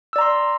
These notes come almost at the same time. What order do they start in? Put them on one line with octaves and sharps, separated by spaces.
E6 D5 A#5 C6